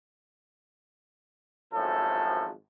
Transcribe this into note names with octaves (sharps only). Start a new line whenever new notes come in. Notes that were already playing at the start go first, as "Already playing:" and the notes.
G#1 F#2 A2 F3 A4